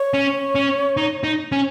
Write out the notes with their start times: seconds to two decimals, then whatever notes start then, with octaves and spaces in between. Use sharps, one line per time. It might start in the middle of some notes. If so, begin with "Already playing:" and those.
Already playing: C#5
0.14 C#4
0.55 C#4
0.97 D#4
1.24 D#4
1.52 C#4